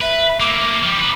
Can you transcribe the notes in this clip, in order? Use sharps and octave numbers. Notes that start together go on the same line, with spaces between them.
B4 E5
A3 A#3 D6
F3 G3
D#4 B4